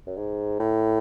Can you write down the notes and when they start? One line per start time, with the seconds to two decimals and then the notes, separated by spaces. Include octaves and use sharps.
0.07 F#2
0.17 G#2
0.60 A2